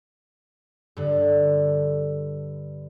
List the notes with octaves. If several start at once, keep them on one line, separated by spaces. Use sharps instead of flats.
G2 D3